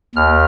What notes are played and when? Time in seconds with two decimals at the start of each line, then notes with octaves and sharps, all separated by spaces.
0.15 D#2 F6